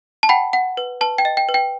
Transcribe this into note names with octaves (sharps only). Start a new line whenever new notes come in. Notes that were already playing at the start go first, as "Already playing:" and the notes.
A5
F#5 G5 B5
F#5
B4
B4 A5
G5
D#5
G5
B4
G5